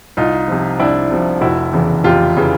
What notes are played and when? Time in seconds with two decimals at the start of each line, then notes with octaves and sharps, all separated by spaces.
0.17 C2 D#4 F4
0.48 C3 F3
0.79 C2 D4 E4
1.11 C3 F3
1.41 F1 E4 F#4
1.73 E2 C#3 E3
2.04 F1 F4 G4
2.37 C#3 E3